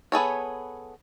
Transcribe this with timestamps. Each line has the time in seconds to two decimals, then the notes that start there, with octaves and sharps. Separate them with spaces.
0.12 B3 G#4 A4 C#5